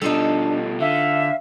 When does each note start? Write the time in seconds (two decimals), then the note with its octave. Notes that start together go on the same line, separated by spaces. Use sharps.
0.02 B2 G3 D4 D#4 F4 A4
0.80 D3 E5 F5